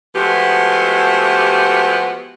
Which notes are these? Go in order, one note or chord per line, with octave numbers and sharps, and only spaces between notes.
F3 G#3 A3 B3 F#4 G4